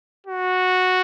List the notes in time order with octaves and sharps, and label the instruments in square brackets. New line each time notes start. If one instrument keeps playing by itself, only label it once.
[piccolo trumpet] F#4